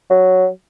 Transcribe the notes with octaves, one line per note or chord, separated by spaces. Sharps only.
F#3